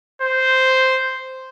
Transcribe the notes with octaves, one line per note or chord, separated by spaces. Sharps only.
C5